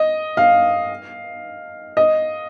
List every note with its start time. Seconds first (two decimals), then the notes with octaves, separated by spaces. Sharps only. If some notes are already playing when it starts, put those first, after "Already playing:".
Already playing: D#5
0.37 F5
1.97 D#5